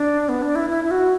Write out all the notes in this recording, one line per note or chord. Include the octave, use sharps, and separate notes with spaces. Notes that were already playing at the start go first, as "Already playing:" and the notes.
Already playing: D4
B3
D4
E4
E4
E4
F#4